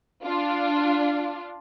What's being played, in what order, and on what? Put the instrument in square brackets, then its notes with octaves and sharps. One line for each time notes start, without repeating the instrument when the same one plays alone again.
[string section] D4 F4